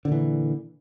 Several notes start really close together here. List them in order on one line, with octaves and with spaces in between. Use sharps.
D3 A#2 E3